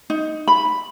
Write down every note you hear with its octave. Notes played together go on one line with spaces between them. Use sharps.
D#4
B5